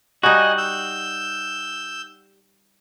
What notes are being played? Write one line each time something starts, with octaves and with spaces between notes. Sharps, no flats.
G3 D#4 F#4 D#5 G#5
E6 G6